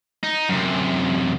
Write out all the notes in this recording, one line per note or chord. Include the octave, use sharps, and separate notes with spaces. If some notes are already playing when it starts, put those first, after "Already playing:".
D#4
F#2 C3